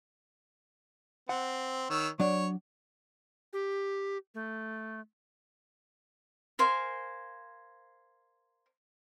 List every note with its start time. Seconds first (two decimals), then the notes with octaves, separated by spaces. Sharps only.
1.29 C4 F#5
1.90 D#3 C#5 E6
2.19 F#3 D4 C#5 D5
3.53 G4
4.35 A3
6.59 A#4 C5 F5 G#5